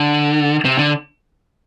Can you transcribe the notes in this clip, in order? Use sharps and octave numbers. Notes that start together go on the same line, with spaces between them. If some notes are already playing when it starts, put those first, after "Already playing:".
Already playing: D3
C3
D3